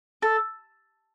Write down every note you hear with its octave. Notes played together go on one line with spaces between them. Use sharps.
A4